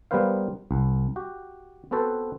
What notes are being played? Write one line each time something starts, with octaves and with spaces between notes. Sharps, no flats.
G3 A#3 B3 B4 C5 F5
C2
F#4 G4
B3 C4 F#4 A4 B4 C5